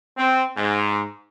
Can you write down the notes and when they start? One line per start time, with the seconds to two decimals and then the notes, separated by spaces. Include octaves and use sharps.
0.18 C4
0.56 G#2